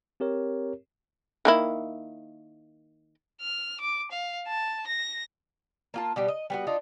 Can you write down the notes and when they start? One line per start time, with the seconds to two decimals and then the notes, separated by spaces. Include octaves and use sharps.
0.20 C4 G4 A#4 C#5
1.45 D#3 A#3 E4
3.41 F6
3.81 D6
4.11 F5
4.48 A5
4.87 A#6
5.94 A#3 F4 A5
6.16 B2 G3 G4
6.28 D#5
6.50 G3 B3 F#4
6.67 D4 D#4 F4